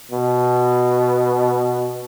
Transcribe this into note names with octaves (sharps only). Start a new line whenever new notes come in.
B2